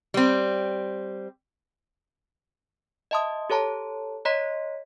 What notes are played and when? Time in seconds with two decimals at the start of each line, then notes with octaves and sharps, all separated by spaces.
0.14 G3 C4
3.11 D#5 E5 A5 C6 D#6
3.50 G4 A4 C#5 A5 A#5
4.25 C#5 D#5 A#5 C6 B6